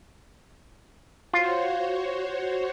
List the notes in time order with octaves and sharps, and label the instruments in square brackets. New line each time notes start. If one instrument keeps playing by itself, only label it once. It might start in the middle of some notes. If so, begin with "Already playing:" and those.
[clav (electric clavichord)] F4 [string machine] F#4 C5 C#5